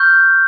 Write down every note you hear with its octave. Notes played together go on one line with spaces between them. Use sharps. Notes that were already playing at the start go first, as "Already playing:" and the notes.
Already playing: C#6 F6 G6